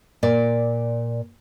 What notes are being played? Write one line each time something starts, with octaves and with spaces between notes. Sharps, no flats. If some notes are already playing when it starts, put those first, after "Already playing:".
A#2 D5